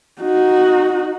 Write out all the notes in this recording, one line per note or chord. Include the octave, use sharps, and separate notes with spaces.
D#4 F#4